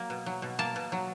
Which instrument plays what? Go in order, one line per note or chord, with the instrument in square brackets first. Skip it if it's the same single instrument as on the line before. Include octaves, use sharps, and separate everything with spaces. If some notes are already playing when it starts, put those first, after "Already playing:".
Already playing: [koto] F#3 A#3
B2
F#3
B2
A#3 A5
B2
F#3